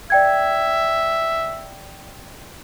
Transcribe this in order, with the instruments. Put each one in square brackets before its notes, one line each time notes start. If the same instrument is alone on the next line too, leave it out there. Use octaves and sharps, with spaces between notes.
[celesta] D5 G5 G#6 [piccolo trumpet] E5